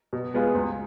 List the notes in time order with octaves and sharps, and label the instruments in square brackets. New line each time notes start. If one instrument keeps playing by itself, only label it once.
[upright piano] B2
G#3 B3 F4 G#4
C#2